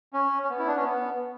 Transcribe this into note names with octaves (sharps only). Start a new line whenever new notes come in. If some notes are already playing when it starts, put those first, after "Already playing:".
C#4
C#4
B3
E4
D4
C#4
B3